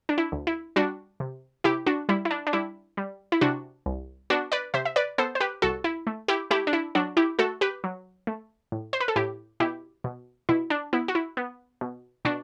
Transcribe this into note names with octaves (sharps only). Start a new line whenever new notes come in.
D4
E4
D2
E4
G3 D4 F#4
C3
C3 E4 G4
D4 F#4
G3 E4
E4
D4
D4
G3 E4
G3
E4
C3 D4 F#4
C2
B3 D4 F#4
B4 D5
C3 C5 E5
E5
B4 D5
B3 A4 C5
C5
G4 B4
C2 F#4 A4
E4
A3
E4 G4
A3 E4 G4
D4
E4
F#3 D4 F#4
E4 G4
A3 F#4 A4
G4 B4
F#3
A3
A2
C5
B4
A4
A2 E4 G4
B2 E4 G4
B2
B2 E4
D4
B3 E4
F#4
E4
B3
B2
B2 D4 F#4